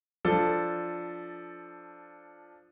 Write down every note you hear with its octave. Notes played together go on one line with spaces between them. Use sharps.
F3 D4 A4